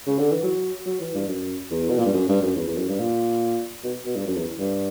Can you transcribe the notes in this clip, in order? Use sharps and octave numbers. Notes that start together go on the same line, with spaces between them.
C#3
D3
E3
F#3
F#3
E3
G2
F#2
E2
B2
A#2
G2
F#2
G2
F#2
E2
E2
F#2
G2
A#2
B2
B2
G2
F#2
E2
G2